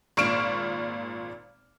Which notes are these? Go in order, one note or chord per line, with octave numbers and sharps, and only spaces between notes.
G#1 A#2 C#6 F6 D7 E7